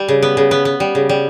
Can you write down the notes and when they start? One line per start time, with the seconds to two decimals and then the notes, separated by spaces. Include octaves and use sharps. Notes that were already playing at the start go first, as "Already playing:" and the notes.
Already playing: G3
0.08 C#3
0.22 B3
0.37 C#3
0.51 B3
0.65 B3
0.80 G3
0.95 C#3
1.09 G3